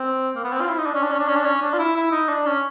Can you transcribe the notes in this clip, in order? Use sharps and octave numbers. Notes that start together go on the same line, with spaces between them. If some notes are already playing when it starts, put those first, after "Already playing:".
Already playing: C4
A#3
B3
C4
F4
E4
D#4
D4
C#4
D4
C#4
D4
C#4
D4
C#4
D4
F4
E4
E4
D#4
D4
C#4